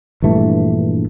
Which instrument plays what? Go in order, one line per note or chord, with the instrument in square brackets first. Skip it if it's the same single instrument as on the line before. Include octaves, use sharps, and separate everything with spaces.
[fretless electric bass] A#1 G2 E3 A3